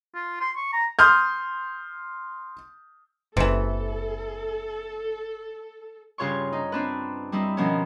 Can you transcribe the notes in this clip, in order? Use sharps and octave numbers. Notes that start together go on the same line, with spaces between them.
F4
C6
C#6
A#5
C6 D#6 F6 G6
F#1 C3 E3 A4
G2 C#3 F4 C#5 C6 C#6
D#4
C4 D4 B4
G3 C4 D#4 E4
B2 D#3 F3 B3 C#4